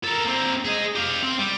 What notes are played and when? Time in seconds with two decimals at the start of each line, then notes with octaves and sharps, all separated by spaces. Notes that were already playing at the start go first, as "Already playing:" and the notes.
0.04 A4 A#4
0.25 A#3 C4
0.65 G#4 D#5
0.95 G4 F5
1.23 C4
1.39 G3